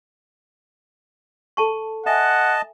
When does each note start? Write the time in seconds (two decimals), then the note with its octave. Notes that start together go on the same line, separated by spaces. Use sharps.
1.57 A4 A5 C#6
2.06 D#5 E5 F#5 G#5 A5